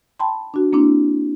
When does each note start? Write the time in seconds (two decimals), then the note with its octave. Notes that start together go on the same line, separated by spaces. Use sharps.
0.20 G5 A5 B5 C6
0.54 D4 F#4
0.73 A#3 C4 D4 E4